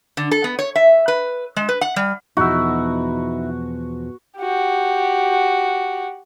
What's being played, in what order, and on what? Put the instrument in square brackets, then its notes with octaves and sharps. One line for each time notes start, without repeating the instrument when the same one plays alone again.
[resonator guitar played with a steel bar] D3
A4
B3
C#5
E5
B4
G#3
B4
F#5
G3
[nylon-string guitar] E2 B2 F3 [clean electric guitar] D#4 E4 [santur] F#4
[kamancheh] F#4 G4